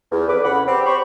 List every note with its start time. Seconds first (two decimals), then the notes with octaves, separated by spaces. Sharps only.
0.12 E2
0.28 F2 B4 D6
0.44 C#3 F#5 B5
0.67 C4 G4
0.86 C5 B5 C#6